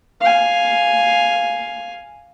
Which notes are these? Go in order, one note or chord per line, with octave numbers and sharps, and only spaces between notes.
F5 G#5